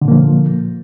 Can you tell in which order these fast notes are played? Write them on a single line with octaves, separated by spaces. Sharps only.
D3 A#2 A#3 F3